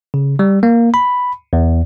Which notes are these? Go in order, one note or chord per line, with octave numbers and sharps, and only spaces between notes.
C#3
G3
A#3
B5
E2